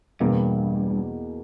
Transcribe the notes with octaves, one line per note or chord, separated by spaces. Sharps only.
E2 G2 B2 A#3